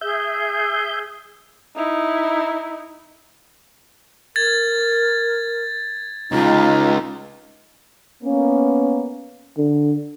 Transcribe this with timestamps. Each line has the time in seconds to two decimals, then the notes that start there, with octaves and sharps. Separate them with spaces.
0.01 G#4 E5 G6
1.76 D#4 E4
4.36 A#4 G#6 A6
6.32 C#2 D#4 F4
8.23 A#3 B3 C#4
9.58 D3